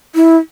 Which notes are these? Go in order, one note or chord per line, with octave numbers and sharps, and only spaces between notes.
E4